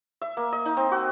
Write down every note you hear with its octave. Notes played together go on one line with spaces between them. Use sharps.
E5
A#3
D#5
D#4
C4
F#4